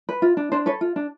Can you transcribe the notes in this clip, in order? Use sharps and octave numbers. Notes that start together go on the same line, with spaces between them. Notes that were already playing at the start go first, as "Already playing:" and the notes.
B4
F4
D4
D4 C5
A4 B4 C#5
F4
D4